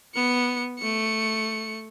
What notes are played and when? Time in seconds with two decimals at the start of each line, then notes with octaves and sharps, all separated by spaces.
0.15 B3 C#7
0.79 A3 C#7